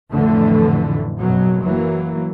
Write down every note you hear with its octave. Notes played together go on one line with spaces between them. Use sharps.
A1 F2 A2 D3 E3 A3
F#1 F#2 B2 F#3
E3 F#3 A#3